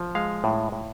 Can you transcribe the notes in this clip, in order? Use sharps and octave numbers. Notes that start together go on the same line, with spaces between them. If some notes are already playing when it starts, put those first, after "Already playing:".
Already playing: F3
G#3 F5
A2
A2